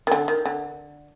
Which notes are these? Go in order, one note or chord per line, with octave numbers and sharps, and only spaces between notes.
D#3
D3
D#3
D3